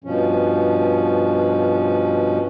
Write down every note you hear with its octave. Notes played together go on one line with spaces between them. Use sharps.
G2 B2 F3 C#4